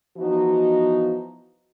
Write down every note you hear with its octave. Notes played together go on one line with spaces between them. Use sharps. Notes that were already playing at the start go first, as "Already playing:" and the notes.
E3 F3 B3 D#4 F#4